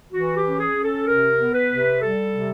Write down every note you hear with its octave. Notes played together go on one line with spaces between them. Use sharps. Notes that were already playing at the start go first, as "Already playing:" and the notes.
E3 F#4
G4
C#4
G#4
C#4
A4
C3 A#4
B3
B4
C3
G3 A4
C3